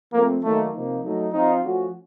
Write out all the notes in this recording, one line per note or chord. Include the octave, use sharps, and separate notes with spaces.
F3 A3 A#3 C4
D#3 F#3 A3 A#3 D#4
C3 F3 A#3 D#4
F#3 A3 D#4
F3 C4 D#4 F4
F3 A3 C#4 F#4